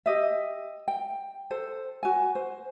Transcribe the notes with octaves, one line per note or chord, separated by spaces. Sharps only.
G4 D#5 E5
G5
A4 C5
F#4 G#5
C5